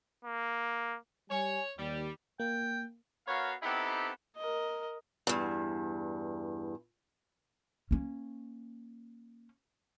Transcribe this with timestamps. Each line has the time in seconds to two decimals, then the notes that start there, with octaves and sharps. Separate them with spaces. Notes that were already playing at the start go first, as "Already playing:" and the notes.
0.25 A#3
1.30 G3 C#5 G#5
1.78 D#2 G3
2.40 A#3 G5
3.27 B3 F#4 A#4 C#5 F5
3.63 B3 C4 D#4 E4 G4 A4
4.37 A#4 D#5
5.27 E2 G2
7.91 A#3 C#4